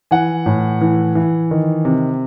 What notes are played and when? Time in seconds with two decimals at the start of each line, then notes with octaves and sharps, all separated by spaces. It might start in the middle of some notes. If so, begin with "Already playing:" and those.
0.11 E3 F#5 G#5
0.46 A2
0.81 E3
1.15 E3
1.51 D#3
1.85 C3